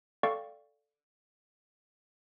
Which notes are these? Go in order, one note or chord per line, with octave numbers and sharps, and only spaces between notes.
A4 D5 F5 G5 C#6